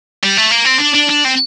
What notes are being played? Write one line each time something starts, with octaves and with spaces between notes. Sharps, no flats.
G3
A3
A#3
C4
D4
D4
D4
C4